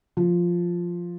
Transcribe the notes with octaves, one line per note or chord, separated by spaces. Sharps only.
F3